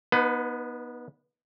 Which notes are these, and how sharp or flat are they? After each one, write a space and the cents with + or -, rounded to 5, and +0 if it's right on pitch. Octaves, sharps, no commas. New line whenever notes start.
B3 -25 D#4 +0 B4 +25